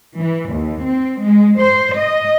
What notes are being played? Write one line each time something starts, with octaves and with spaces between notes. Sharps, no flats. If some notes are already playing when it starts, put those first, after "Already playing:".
E3
D#2
C4
G#3
C5
D#5